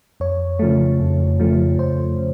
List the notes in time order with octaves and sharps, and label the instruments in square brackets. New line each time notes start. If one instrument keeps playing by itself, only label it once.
[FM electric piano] F2 C#5
C#3 F3 A3
F2
C#3 F3 A3
F2 C5
C#3